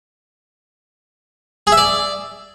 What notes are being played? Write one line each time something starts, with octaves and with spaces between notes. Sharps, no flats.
G#4
E5
D5